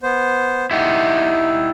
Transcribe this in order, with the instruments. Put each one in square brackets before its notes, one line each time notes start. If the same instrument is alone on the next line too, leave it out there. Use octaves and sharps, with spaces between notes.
[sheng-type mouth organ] B3 C5
[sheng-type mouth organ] D#4 [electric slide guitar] E4 G4 F#5